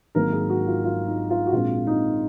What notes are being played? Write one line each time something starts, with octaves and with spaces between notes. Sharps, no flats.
G#1 G#2 F#3 A#3 A#4
G#4
F#4
F4
F4
D#4
F4
F#4
A#1 A#2 G#3 C4 F4
D#4